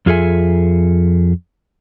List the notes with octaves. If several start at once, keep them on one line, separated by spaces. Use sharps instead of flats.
F2 F4 G#4 A4 E5 G#5